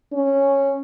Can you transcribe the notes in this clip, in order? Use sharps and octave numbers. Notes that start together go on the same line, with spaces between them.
C#4